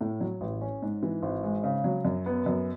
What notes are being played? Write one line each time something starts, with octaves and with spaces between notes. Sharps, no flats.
A2
F#3
A1
C#4
G#2
E3
G#1
G#3
C#3
F#3
F#2
B3
F#2